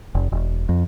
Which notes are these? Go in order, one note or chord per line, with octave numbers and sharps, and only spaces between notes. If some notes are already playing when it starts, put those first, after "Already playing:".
F1
E1
F2